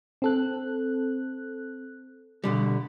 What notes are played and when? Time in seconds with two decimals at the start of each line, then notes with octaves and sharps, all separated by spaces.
0.22 C4 A4 F#6
2.44 B2 D3 G3